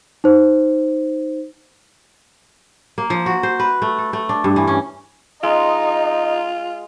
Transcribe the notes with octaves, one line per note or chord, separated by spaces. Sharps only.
D#4 C5
A#3
F3
F#4
C5
B4
A3
A4
A3
D4
G2
E3
C#4
G#3 D#4 F4 D#5